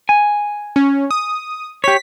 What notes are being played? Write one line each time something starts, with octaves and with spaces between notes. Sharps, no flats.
G#5
C#4
D#6
G4 C#5 B6